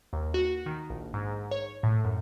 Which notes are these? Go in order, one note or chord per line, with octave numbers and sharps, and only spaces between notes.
D#2
F#4
D#3
A#1
G#2
C#5
A2
F#2